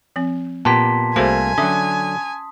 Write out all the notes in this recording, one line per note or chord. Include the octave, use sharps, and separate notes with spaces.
F3 C4
A#2 B3 G4 A5 C6 B6
C2 A3 A#3 F#4 G#4 C5 G#5
D3 F#3 C#4 E5 D#6